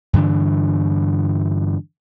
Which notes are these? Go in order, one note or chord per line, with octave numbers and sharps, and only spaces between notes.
G2 D3 E3 D4